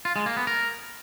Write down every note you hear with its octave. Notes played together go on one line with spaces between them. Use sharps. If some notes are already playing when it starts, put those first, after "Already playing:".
F4
G#3
A#3
B3
A#4